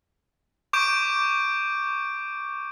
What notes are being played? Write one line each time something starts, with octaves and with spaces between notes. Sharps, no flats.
C#6 D6 G6 D7